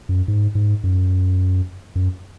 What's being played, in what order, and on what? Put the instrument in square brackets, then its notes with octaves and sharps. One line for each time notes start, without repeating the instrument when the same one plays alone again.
[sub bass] F#2
G#2
G#2
F#2
F#2